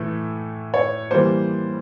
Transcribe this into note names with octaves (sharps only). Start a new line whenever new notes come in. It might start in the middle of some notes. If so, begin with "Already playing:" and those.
Already playing: A2 E3 A3
C#5
E3 G3 A#3 C5